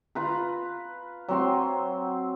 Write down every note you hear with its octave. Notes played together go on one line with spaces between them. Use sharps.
F4 B4 A#5
F#3 C4 C6